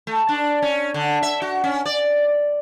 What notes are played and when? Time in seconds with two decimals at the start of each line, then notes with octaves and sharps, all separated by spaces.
0.07 A3
0.29 D4
0.62 C#4
0.94 D3
1.23 E5
1.42 F#4
1.64 C#4
1.86 D5